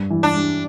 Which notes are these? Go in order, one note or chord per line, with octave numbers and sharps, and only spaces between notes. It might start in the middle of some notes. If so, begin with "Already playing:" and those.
Already playing: G2
E3
D4
G3